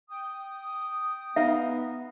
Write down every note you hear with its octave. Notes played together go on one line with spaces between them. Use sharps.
G5 D#6
B3 D#4 E5 F5